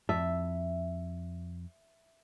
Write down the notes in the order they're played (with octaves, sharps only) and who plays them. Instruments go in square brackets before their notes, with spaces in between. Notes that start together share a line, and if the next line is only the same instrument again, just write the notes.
[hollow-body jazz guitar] F2 A5 [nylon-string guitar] E5